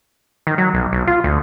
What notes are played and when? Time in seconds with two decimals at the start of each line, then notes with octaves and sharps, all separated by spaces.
0.47 D#3
0.58 F#3
0.74 B1
0.93 B1
1.07 F4
1.24 D2